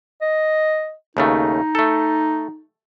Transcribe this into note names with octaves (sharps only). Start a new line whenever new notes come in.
D#5
D#2 C#3 A3 D#4
A3 A4